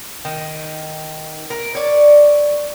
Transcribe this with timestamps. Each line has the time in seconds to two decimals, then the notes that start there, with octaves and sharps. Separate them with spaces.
0.25 D#3
1.50 A#4
1.75 C#5 D5